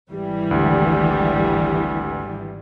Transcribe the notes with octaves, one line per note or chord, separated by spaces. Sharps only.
G#1 E3 G3
D2